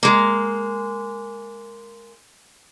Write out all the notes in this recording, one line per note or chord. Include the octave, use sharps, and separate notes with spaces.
G#3 A#3